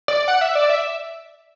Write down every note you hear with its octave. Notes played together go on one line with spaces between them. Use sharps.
D5
F#5
E5
D5
E5